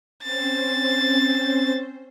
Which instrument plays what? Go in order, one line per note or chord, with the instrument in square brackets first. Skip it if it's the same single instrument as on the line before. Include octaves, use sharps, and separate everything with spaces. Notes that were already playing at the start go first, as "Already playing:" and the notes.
[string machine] C4 C#4 C5 [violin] A6